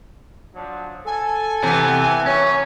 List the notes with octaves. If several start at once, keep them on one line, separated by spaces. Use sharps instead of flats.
F3 F#3 D4
A4 G#5
C3 E3 B3 C4
C#2 F#3 A#3 C#4 C#5